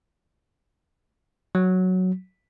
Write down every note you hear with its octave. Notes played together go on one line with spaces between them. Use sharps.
F#3